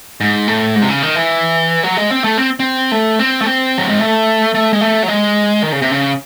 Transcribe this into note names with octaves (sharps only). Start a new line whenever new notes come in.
G#2
A2
G#2
C3
C#3
D#3
E3
F#3
G#3
C4
A3
C4
C4
A3
C4
A3
C4
F#3
G#3
A3
A3
G#3
A3
F#3
G#3
D#3
C#3
C3
C#3